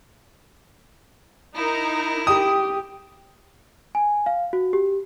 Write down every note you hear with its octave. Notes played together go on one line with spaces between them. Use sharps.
D#4 E4 A#4 A#5
G4 D#6
G#5
F5
F#4
G4